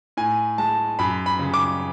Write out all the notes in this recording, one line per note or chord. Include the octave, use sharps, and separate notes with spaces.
A2 G#5
G#3 A5
F#2 B5
B5
C#3
D6